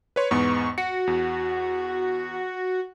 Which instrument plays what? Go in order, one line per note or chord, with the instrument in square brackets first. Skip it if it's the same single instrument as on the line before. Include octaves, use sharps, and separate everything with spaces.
[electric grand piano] B4 C#5 C6
[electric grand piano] E2 G#2 B3 [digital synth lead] C#6
[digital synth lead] F#4 [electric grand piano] C#7
[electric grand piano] E2